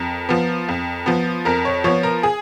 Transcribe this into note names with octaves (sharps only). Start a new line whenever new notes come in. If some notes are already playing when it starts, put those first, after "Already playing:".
Already playing: F2 A#4
F3 B3
F2
F3 B3
F2 A#4
C#5
F3 B3 C#5
A#4
G#4